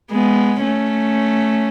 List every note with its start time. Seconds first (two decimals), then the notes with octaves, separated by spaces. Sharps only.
0.11 G#3 B3
0.63 A3 C#4